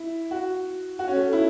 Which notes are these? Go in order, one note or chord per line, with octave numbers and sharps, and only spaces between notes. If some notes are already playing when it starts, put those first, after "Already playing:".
Already playing: E4
F#4
F#4
C#4
A3
E4